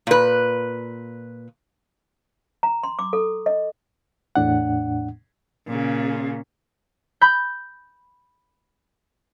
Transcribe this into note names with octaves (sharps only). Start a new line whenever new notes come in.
A#2 B4
A#5
C6
D6
A4
D#5
E2 A2 D4 F#5
A#2 C#3
B5 G6